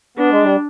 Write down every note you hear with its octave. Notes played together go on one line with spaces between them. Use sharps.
B3 D4
G#3
G3